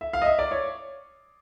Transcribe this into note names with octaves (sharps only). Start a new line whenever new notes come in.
E5
F5
D#5
E5
D5
C#5